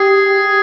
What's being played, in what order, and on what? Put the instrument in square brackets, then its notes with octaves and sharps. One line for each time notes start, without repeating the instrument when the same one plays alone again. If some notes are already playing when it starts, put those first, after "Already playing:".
Already playing: [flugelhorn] G4 [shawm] G#4